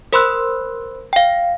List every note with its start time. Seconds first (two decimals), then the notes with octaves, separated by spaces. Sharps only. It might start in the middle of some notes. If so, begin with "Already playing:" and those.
0.13 A#4 C5 B5 C6 E6 F#6
1.13 F5 G5